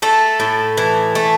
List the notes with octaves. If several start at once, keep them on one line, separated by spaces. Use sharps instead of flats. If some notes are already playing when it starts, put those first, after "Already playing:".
A3 A4
A2
E3
A3